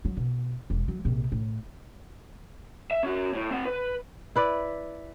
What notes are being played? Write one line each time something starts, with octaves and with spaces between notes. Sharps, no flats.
F#3
B2
E1
F#3
A#1 C3
A2
E5
C#4 F#4
A2
C4 F#5
B4
E4 B4 D5